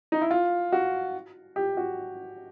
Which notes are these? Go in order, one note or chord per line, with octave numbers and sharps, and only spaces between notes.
D#4
E4
F4
F#4
G4
F#4